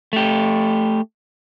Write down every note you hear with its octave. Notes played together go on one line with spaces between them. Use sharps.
A3 G4